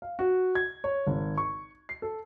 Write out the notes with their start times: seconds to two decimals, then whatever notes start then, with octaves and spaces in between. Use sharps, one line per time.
0.02 F5
0.19 F#4
0.55 G#6
0.84 C#5
1.07 G#1
1.38 C#6
1.89 C7
2.02 A4